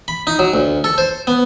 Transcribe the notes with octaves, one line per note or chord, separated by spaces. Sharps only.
B5
D#4
F#3
D2
A4
C5
B3